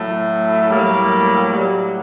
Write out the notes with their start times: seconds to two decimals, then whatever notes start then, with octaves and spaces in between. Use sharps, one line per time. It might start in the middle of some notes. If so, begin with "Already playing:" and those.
Already playing: A2 F#3 A3
0.70 A2 F#3 G3 A#3
1.50 A2 F#3 G3